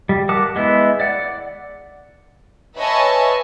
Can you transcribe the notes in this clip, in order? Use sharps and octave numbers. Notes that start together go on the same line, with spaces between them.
G3
A#4 F#5 A5 D6
G#3 B3 E4
D5 F#5
B4 C#5 D#5 E5 G#5 A5